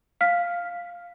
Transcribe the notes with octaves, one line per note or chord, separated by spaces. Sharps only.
F5 F6 B6